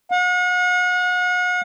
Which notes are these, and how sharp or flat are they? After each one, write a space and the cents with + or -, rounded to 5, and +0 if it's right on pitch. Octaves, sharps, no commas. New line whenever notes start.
F#5 -40